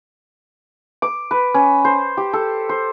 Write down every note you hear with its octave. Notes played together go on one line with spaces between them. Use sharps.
D6
B4
C#4
C5
G4
A4
C5